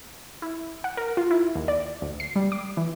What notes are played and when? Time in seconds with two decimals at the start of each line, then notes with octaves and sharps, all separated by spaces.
0.42 E4
0.84 F#5
0.97 A#4
1.17 F4
1.31 E4
1.55 D#2
1.68 D5
2.02 D2
2.20 C7
2.36 G3
2.52 D6
2.77 E3